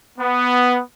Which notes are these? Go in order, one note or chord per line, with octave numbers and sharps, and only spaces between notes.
B3